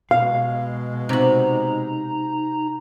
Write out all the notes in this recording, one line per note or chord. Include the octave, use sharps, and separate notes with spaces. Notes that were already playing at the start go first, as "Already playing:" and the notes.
B2 G#3 F5
C3 D#4 F#4 A#5